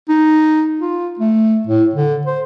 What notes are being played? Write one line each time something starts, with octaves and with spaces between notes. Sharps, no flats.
D#4
F4
A3
A2
D3
C5